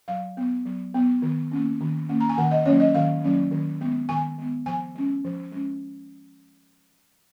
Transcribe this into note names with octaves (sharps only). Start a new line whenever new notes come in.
F#3 F5
B3
F#3
B3
D#3
A#3 C#4
D#3
A#3 C#4
A#5
G#5
D#3 F#5
D#5
F#3 A#3 C#4 C#5
D#5
D#3 F5
F#3 A#3 C#4
D#3
G#3 B3
D#3 G#5
G#3 B3
F3 G#5
G#3 C#4
F3
G#3 C#4